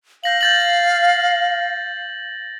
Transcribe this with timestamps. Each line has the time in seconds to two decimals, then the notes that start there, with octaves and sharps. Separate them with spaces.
0.24 F5 G6 A#6 F#7
0.41 G6 A6 F#7